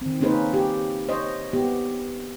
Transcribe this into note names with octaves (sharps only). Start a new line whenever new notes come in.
D#3 C4
A#3 C#4 D#4 G#4 B4 C5
G4
C5 C#5 D#5
B3 G4